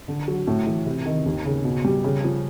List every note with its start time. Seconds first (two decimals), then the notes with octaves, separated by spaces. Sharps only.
0.08 D3
0.28 F#3
0.47 A2
0.67 E3
0.86 C3
1.06 D#3
1.26 D#2
1.45 C#3
1.64 B2
1.85 G3
2.04 C#3
2.24 F3